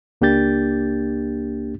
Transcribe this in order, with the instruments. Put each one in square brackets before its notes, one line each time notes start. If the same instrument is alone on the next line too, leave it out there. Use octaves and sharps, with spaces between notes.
[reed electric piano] C#2 A#3 D4 G4 G6 A6